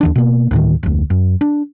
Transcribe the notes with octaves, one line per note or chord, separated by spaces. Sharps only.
D#2 E3 D4
B2 A#3
D2 A2 D#3
F1 D2
F#2
D4